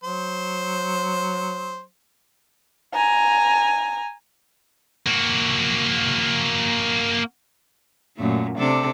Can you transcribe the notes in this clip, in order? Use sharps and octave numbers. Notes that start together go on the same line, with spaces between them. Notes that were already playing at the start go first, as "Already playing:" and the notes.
F#3 C5
G#5 A#5
A#3 F#4
F#2 A#2 A3
C3 D4 A4